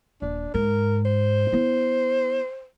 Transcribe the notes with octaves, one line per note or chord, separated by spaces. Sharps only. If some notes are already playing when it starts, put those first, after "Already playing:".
D#1 D4
G#2 A#4
C5
B3 E4